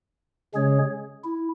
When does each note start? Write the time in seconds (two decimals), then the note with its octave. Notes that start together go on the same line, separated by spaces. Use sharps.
0.54 C#3 G#3 C#4 G#4 C#5
1.24 E4